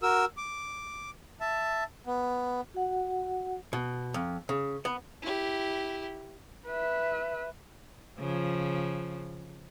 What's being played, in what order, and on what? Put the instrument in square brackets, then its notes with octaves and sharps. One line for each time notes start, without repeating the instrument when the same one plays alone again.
[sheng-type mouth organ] F#4 A#4 E6
D6
E5 A5
B3
[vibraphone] F#4 F#5
[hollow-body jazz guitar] B2
F2
C#3
B3
[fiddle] E4 G4
[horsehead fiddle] B4 E5
[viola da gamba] C#3 F3